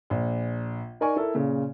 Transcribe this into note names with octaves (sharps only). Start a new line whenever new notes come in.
A#1
D#4 A#4 D5 G#5 C#6
E4 A4 A#4
A#2 C#3